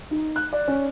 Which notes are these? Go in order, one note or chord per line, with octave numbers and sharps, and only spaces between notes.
D#4
F#6
D5
C#4